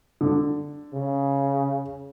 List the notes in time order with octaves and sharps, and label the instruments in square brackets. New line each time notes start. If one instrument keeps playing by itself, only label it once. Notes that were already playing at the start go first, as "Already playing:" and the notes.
[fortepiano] D3
[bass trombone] C#3